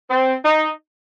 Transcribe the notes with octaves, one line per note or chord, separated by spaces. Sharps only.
C4
D#4